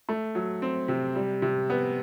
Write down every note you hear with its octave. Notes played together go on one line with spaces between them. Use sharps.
A3
F#3
C4
C3
G3
C3
B3